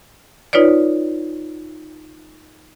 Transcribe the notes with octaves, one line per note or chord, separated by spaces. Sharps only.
D#4 F4 B4 C#5 D5